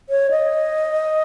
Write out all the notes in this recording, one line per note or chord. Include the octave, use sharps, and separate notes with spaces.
C#5
D#5